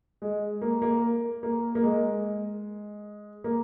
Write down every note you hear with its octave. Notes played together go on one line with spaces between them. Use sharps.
G#3
A#3
A#3
A#3
A#3
G#3
A#3